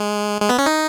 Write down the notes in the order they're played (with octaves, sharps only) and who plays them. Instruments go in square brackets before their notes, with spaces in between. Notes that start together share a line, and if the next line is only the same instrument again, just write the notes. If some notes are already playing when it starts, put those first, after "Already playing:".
Already playing: [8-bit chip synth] G#3
G#3
B3
C#4
D#4